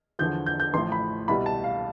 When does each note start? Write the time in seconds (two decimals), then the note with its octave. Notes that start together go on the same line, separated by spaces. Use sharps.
0.19 E2 D3 F3 G6
0.46 G6
0.60 G6
0.74 A1 A2 F3 C6
0.92 B5
1.28 C2 B2 G3 B5
1.46 A5
1.64 F5